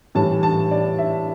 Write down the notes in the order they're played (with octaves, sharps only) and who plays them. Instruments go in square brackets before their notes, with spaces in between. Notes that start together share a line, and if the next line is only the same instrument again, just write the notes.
[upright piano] A2 E3 G3 A5
A5
D5
E5